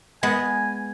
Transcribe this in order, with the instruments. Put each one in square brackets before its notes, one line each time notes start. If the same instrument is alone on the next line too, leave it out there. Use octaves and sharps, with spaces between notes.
[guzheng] G#3 B3 [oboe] G#5